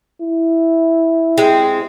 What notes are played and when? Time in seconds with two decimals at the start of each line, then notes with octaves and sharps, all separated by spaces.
0.21 E4
1.38 G#3 C4